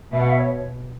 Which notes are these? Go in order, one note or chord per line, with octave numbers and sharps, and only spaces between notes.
B2 E5
F#5
E5
C#5